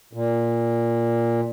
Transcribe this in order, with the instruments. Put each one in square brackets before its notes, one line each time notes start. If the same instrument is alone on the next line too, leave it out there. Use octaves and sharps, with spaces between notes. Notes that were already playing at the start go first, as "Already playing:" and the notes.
[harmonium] A#2